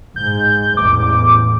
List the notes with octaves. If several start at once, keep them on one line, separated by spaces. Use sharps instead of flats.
G#2 G6
A1 E2 D6